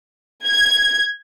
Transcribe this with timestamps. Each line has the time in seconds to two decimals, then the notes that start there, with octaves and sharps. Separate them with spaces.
0.46 G#6